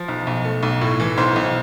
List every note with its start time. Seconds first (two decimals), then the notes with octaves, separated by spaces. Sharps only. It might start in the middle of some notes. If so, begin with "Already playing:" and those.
Already playing: F3
0.08 B1
0.27 B1
0.45 A3
0.63 B1
0.81 A2
1.00 E3
1.18 B1 C5
1.36 B1